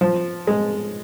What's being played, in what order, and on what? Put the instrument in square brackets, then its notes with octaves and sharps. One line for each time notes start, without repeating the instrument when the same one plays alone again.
[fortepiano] F3
G#3